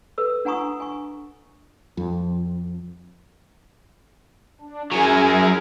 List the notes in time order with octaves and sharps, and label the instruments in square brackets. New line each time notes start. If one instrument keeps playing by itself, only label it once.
[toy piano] A4 B4 E6
D4 F#5 G#5 A#5 C#6 D#6
G#5 C#6
[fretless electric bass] F2
[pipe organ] D4
[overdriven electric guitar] F#2 F#3 [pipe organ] E4 A#4 [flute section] G#4 [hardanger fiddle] G#5